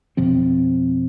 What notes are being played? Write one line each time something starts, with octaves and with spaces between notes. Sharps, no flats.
F2 B2 F3 C4